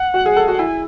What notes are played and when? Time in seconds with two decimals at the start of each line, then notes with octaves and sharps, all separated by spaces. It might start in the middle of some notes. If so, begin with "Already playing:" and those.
Already playing: F#5
0.14 F#4
0.26 G#4
0.37 A4
0.48 F#4
0.59 E4 G#5